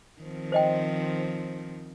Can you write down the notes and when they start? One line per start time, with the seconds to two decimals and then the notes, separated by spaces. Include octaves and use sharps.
0.22 D#3 F3 C4
0.52 C5 D#5 G5